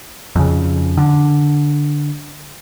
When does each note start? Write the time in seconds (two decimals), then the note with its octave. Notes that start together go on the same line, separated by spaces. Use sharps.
0.36 F2 C#3
0.97 D3